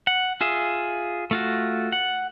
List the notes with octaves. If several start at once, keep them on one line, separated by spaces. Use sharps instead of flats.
F#5
F4 G#4 E5
A3 F4 F#4
F#5